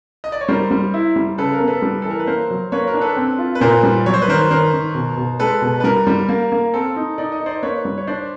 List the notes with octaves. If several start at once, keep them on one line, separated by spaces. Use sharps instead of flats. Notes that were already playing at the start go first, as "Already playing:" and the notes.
D#5
D5
C#5
G3 A#4 C5
G3
E4
G3
C#3 A4 B4
A#4
B3
A4 B4
G3
A4
E3
A#4
B4
A#3 A#4 C5
F#3
A#3 B4 C#5
A#4
D4
A4 B4
C4
F4
B4
A#2 A#4 C5
G3
F#3 C#5
C5
B4
D#3 A#4 C5
D#3 A#4 C5
D#3
B2
B2
G#3 A4 B4
B2
B4
G3 A#4
G3
A#3
A#3
C4 A4
D#4
D#4 D5
D#5
D#4
C5 D5
A#3 B4 C#5
G3
C#5
D4 C5 D5